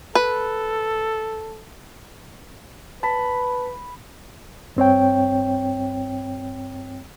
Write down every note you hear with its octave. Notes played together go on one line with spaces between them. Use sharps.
A4 B4
B4 A5 B5
G2 C4 C#5 G5